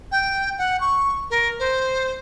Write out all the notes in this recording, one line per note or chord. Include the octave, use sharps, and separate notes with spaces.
G5
F#5
C#6
A#4
C5